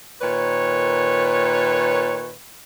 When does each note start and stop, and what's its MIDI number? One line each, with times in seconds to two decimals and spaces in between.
0.22 2.33 46
0.22 2.33 51
0.22 2.33 71
0.22 2.33 73